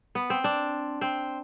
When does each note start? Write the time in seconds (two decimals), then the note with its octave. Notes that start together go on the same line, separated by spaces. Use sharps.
0.15 B3
0.30 C4
0.44 D4
1.01 C4